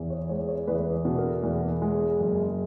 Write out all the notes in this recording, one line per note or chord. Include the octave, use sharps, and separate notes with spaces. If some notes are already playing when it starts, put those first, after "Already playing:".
Already playing: E2
C#5
G#3 C#5
C#5
E2 B4
B2
A#4
E2
G#3
F#1